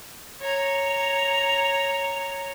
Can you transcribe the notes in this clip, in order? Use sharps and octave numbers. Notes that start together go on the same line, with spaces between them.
C#5 A#5